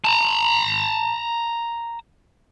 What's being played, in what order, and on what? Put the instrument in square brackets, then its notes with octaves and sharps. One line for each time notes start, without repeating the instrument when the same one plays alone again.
[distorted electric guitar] A5 A#5